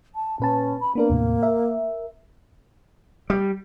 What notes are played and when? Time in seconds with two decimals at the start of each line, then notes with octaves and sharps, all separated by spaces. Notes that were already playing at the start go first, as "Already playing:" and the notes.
0.15 A5
0.40 A#2 C#4 B4 A5
0.80 B5
0.95 A#3 B3 D4 A#4
1.10 D#2 A2 C3
1.43 A#4 E5
3.30 G3